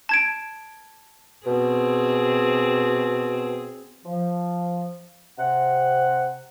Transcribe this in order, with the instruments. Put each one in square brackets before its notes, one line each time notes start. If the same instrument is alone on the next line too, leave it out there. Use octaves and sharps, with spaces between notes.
[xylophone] A5 G#6 D7
[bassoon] B2 [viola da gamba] C4 G#4
[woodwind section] F3
C3 F#5